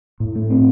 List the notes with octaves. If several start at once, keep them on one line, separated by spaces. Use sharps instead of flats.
A2
A3
C4